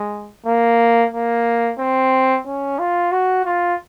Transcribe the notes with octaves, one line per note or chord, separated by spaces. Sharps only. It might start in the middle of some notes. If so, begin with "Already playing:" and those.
Already playing: G#3
A#3
A#3
C4
C#4
F4
F#4
F4